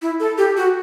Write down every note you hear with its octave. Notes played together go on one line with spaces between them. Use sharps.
E4
A4
G4
F#4